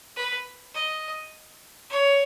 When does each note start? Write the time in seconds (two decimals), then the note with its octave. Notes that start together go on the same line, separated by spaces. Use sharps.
0.16 B4
0.74 D#5
1.90 C#5